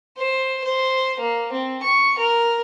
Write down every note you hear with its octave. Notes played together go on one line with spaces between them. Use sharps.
C5
C5
A#3
C4
C#6
A#4